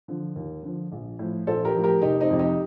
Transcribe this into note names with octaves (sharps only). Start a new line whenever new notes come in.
D3 F3
D#2
D3 F3
A#1
A2 F3
A#1 A4 C5
G4 A#4
A2 F3
G4 A#4
F1 D#4 G4
C4 D#4
F2 C3
D#4 G4